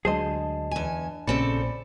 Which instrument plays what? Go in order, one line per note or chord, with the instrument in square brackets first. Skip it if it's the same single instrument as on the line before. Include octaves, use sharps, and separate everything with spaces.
[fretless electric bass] D2 F#3 G#3 [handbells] D4 A5 [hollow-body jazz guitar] G#4 C5 D#5
[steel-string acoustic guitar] E2 G#5
[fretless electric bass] A#1 A#2 [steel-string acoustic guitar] C#3 C4 A4 [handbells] D5 B5 C#7